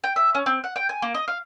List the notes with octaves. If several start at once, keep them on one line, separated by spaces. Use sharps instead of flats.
G5
E5
C#4
C4
F#5
G5
G#5
A#3
D#5
F5